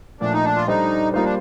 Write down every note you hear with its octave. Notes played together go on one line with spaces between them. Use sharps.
A#2 F3 A3 D4
D#4
D4
F4
G3 D4 D#4 A4 C5
G3 A#3 D#4 F4 C5
D4